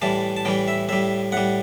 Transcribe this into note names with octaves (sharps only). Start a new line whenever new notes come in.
A2 E3 G3 A5
A5
A2 E3 G3 G5
E5
A2 G3 E5
A2 G3 F#5